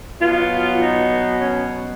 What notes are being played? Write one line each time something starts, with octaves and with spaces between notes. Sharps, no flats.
B2 F#3 B3 F4
D#4
C#4